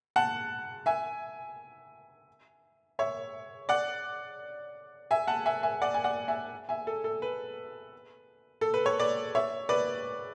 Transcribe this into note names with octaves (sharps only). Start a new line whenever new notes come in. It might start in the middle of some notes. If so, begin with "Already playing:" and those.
F#5 A5
E5 G#5
C#5 E5
D5 F#5
E5 G#5
F#5 A5
E5 G#5
E5 G#5
D5 F#5
G#5
D5 F#5
E5 G#5
E5 G#5
A4
A4
B4
A4
B4
C#5
B4 D5
C#5 E5
B4 D5